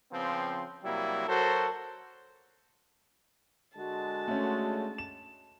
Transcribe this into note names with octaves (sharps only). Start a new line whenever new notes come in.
C#3 F3 B3 C4
C3 F#3 G3 A#3 E4
F#3 F#4 A4 A#4 C5
D3 G#3 F#4 A5
A3 C#4
E7